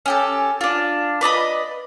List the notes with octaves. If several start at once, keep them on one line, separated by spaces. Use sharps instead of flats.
C#4 G4 A4
D4 F4
B4 D5 D#5 B5